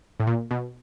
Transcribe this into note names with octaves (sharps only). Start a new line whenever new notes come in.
A2
A#2
B2